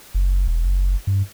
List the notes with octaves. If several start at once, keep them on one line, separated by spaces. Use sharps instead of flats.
F#1
E1
F#1
G2